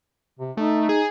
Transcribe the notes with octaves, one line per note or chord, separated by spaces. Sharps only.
C3
A3 D#4
G#4